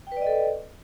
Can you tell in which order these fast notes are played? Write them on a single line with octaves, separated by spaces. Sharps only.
G5 B4 D5 D#5 A4